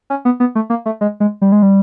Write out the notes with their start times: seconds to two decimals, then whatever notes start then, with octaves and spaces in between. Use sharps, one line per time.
0.10 C#4
0.25 B3
0.40 B3
0.55 A3
0.70 A#3
0.86 A3
1.01 G#3
1.20 G#3
1.42 G3
1.52 G#3
1.63 G3